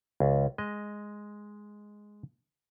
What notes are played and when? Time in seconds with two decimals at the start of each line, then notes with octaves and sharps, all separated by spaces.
0.20 C#2
0.58 G#3 D#5